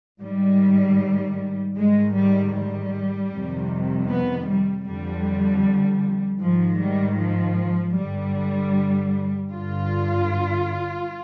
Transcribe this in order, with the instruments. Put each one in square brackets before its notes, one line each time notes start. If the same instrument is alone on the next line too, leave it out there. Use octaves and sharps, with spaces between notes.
[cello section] G#2 D#3 G3
G#2 D#3 G#3
G3
G3
F2 C3 D#3
B3
G3
F2 D3 G3
G#2 D#3 F3
G3
F3
G2 D3 G3
G2 D3 F4